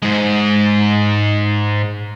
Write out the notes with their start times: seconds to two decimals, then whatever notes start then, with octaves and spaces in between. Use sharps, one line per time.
0.02 G#2 G#3